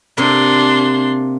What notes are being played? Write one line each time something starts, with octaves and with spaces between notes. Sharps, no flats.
C3 A#3 D4 C6